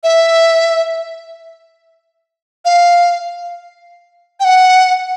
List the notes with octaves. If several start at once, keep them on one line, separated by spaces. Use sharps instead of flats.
E5
F5
G5
F#5